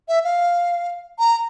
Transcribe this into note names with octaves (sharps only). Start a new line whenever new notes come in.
E5
F5
A#5